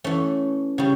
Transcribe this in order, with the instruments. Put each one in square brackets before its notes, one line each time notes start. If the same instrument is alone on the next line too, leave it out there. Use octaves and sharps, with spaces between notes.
[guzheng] E3 A3 C#4
C#3 G3